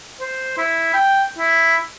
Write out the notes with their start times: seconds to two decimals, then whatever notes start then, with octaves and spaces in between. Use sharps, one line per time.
0.20 C5
0.58 E4
0.94 G5
1.39 E4